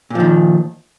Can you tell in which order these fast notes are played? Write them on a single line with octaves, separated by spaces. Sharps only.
A#2 F3 D#3